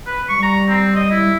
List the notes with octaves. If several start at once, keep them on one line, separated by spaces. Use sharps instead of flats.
B4
G3 C#6
A#5
C4
D#5
E4